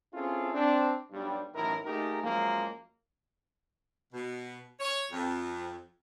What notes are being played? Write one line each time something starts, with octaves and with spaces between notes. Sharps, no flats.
C4 C#4 E4 F4 G#4 A4
C4 D4
B1 G2 G3
A1 F#2 A2 D#3 E4 A#4
A3 A#3 D#4 G4 G#4 A#4
F#2 F3 G#3 A#3
B2
C#5
F2